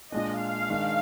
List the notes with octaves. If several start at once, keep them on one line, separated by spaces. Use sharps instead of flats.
A#2 G#3 D4 D#5
F5
D#3 G#3 D4